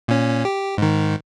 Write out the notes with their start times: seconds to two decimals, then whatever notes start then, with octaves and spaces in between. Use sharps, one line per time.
0.08 A#2 C#4
0.45 G4
0.78 G#2 D#3